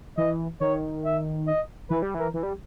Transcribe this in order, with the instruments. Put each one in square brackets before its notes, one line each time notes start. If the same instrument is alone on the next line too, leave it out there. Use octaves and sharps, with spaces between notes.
[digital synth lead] E3 [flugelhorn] D#5
[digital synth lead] D#3 [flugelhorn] C#5
[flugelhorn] E5
D#5
[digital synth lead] E3 [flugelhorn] B4
[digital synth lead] G3
[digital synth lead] E3 [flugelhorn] A#4
[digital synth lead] E3
G3